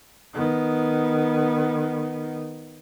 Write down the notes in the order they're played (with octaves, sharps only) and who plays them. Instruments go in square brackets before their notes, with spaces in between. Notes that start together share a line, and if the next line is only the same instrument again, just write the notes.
[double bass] D#3 B3